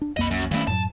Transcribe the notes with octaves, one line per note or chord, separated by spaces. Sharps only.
D4
B1 F2 A#3 D#5 B5
F#2
G2 D#3 A3 C#4 E4
F#2 A2 F#3 A5